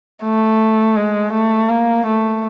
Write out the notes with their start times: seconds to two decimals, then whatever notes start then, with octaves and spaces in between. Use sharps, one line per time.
0.23 A3
0.96 G#3
1.33 A3
1.69 A#3
2.06 A3